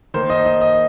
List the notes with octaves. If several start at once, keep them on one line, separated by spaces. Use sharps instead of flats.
D#3 A#3 C5
D#5
D#5
D#5